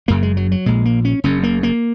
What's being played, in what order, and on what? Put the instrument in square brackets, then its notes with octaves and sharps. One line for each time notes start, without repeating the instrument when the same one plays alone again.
[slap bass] F#1 F#2 C#3 A#3
G#3
F#3
F#3
A#1 A#2 G#3
A#3
C#4
F#1 F#2 C#3 C#4
A#3
A#3